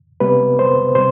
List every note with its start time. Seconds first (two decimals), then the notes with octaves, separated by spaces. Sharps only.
0.20 C3 G3 B3 B4
0.59 C5
0.95 C3 C5